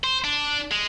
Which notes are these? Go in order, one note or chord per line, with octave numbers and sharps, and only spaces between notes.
C5
D4
G#3